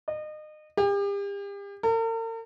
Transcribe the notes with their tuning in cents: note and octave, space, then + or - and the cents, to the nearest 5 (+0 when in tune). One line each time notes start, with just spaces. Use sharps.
D#5 -30
G4 +40
A#4 -45